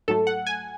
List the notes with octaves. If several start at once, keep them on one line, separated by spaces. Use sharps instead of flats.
G#2 F#3 A3 A4
F#5
G#5